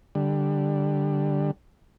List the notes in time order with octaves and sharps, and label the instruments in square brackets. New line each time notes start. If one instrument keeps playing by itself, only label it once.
[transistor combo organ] D3 G3